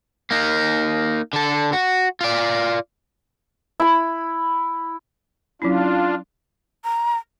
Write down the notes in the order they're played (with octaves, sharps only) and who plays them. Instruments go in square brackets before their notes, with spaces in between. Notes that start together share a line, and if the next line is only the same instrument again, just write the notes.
[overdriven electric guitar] A#3 D#4
D3 A4
F#4
F4 D5
[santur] E4 B5
[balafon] F#3 C#4 E4 [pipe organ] D4 F4
[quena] A#5